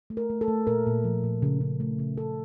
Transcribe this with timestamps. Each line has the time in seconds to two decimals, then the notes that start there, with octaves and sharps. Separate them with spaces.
0.10 A3
0.17 A#4
0.30 A3
0.41 A4
0.48 A3
0.67 A#2 A#4
0.86 A#2
1.04 F3
1.24 A#2
1.42 C#3
1.61 C#3
1.80 A3
1.99 C#3
2.17 C#3 A4